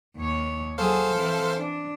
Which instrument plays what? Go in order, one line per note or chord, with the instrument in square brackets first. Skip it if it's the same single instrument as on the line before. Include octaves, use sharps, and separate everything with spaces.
[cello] D#2 C#5
[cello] F#3 G#4 [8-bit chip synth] A4 C5 F5
[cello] E3 C4
D4